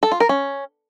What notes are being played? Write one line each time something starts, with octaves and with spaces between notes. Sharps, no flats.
A4
F4
A#4
C#4